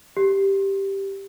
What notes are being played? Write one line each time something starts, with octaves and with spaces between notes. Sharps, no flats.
G4